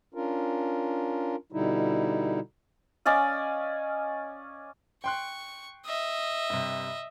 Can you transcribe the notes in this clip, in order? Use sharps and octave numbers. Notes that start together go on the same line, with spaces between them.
C#4 D4 F4 A#4
B2 D3 G3 D#4 E4
C#4 D5 D#5 F5
G5 C6 C#6 F#6
D#5 E5
G2 C3